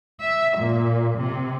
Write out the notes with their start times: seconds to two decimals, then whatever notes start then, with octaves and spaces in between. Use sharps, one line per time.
0.21 E5
0.57 A#2
1.17 C3